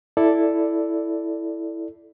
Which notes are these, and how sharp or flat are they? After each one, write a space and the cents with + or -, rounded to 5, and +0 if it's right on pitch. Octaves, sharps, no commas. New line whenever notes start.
E4 +0 A4 +0 D5 +0